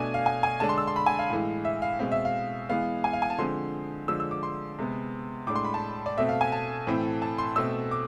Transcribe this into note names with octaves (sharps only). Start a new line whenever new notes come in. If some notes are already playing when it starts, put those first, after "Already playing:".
Already playing: B2 A3 D4 G#5
F5
G#5
G#5
D3 G#3 D4 A5
C6
E6
C6
B5
G#5
F5
A2 E3 G#3
E5
F5
B2 G#3 C4 F5
E5
F5
E3 G#3 B3 F5
G#5
F5
G#5
A5
D3 F3 G#3 C4 C6
D3 F3 G#3 D4 E6
E6
D6
C6
C3 G#3 B3
A2 G#3 D4 D6
C6
B5
A5
D5
B2 A3 C4 E5
F5
G#5
A5
A2 E3 A3 C4
A5
C6
B2 A3 C4 E6
D6